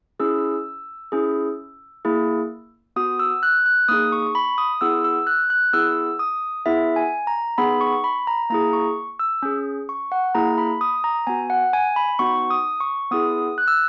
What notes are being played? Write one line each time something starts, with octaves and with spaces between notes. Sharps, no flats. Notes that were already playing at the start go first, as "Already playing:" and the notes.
C#4 E4 G#4 E6
C#4 E4 G#4
A#3 E4 G#4
B3 F#4 D#6
E6
F#6
F#6
A#3 D#4 G#4 D#6
C#6
C#6
B5
D#6
B3 E4 G#4 E6
E6
F#6
F#6
B3 E4 G#4 E6
D#6
B3 E4 G#4 E5
G#5
A#5
B3 D#4 G#4 B5
C#6
B5
A#5
A#3 E4 G#4 A#5
C#6
E6
C#4 G#4
C#6
F#5
A#3 E4 G#4 A#5
B5
D#6
A#5
B3 F#4 G#5
F#5
G#5
B5
B3 D#4 F#4 C#6
D#6
C#6
B3 E4 G#4 D#6
F#6
E6